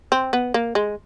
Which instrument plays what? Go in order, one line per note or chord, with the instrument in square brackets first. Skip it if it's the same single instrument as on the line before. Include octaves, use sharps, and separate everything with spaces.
[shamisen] C4
B3
A#3
G#3